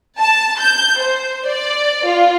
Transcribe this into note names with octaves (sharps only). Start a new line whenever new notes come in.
A5
G6
C5
D5
F4